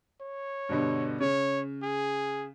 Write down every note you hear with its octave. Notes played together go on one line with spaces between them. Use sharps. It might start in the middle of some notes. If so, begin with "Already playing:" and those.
C#5
G2 B2 D3
C#3 C#5
G#4